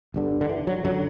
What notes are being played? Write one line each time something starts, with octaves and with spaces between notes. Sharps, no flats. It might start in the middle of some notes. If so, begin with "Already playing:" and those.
G1 G2 D3
D3
E3
F#3
F#2 D3 F#3